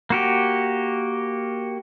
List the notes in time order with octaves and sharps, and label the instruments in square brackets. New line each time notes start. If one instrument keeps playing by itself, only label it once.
[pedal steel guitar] A#3 F#4 G4